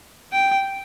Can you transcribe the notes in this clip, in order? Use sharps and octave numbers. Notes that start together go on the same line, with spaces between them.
G5